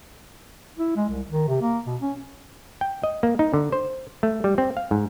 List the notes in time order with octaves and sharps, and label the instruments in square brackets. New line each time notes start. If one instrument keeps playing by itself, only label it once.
[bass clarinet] E4
G#3
C2
D#3
C3
A#3
B2
C#4
[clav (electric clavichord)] G5
D#5
A#3
D#4
D3
C5
A3
G3
C4
F5
G#2